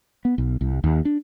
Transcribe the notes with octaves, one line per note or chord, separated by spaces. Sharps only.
B3
B1
C2
D#2
D4